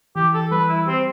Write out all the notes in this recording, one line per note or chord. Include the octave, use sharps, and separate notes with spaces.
E3 G4
A4
G3 B4
E4
C4 G4